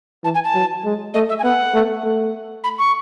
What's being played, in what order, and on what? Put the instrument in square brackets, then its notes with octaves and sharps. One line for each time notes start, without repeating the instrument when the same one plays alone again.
[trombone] E3 [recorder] A5
[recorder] G#5
A5
[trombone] F#3
G#3
[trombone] A3 [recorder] D#5
[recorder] E5
G#5
[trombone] B3 [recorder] F#5
[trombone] A3
A3
[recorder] B5
C#6